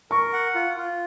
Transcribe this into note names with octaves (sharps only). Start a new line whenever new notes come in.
A#4 C#6
F#5
F4
F4